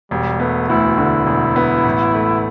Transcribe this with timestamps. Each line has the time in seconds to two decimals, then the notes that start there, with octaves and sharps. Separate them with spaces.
0.11 E1 G3
0.40 A3 B3
0.69 D2 E4
0.98 D3
1.27 E1
1.56 B3
1.85 A1
2.14 A3